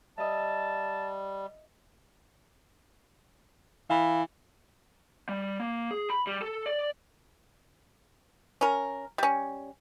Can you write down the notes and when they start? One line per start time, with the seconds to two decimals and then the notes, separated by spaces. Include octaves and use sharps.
0.18 G3 D#5 E5 A5
3.90 E3 F5 B5
5.29 G3
5.60 A#3
5.91 G#4
6.10 B5
6.27 G3
6.42 A4
6.66 D5
8.61 C#4 A#4
9.18 G3 C#4